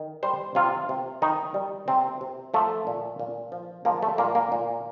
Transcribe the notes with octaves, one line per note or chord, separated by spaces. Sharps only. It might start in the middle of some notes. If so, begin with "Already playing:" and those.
Already playing: D#3
G3 C5
C3 F4
C3
D#3 D#4
G3
C3 C4
C3
F3 A3
A#2
A#2
F3
F3 A#3
A3
A#2 A#3
A#3
A#2